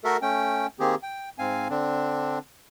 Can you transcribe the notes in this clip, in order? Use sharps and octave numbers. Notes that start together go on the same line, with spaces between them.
A3 F#4 A4 A#4 E5
A3 C#4 G5
D#3 A#3 C4 G4 G#4
G5
G#2 C4 F5 G#5
D3 C4 D4